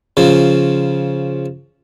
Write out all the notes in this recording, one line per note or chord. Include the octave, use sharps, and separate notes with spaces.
C#3 F3